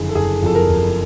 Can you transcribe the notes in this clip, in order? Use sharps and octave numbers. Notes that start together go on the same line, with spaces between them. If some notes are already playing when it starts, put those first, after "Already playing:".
Already playing: F#1 F2 D3 G#4
A4
F#1 G#4
F2 A4
A#4
F#1